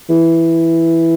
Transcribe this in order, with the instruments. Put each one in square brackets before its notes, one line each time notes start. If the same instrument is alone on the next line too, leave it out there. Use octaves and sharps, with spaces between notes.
[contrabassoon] E3